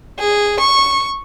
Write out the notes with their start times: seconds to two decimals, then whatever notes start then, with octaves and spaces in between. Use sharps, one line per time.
0.19 G#4
0.60 C#6